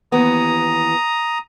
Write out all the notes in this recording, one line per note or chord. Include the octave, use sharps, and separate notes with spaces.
D#2 E3 B3 A#5 D#6